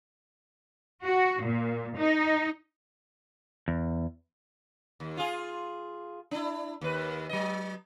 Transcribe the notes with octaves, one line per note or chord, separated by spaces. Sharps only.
F#4
A#2
D#4
E2
D#2
F4 G#4
D4 E4
D#2 B4
F#3 D#5